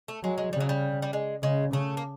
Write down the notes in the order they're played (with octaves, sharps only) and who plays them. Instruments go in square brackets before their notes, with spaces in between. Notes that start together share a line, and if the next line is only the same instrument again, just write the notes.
[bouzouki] A3
[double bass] F#3 [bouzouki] G#3
[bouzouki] G#3
[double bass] C#3 [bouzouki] G3
[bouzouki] F#3
G3
G3
G#3
[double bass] C#3 [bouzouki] G#3
[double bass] C#3 [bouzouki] A3
[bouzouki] A#3